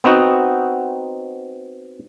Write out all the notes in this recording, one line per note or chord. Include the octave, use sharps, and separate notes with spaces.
B3 C4 D#4 F#4